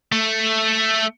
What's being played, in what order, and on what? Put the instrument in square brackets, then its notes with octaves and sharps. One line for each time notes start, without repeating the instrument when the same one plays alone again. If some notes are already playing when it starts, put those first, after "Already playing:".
[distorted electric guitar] A3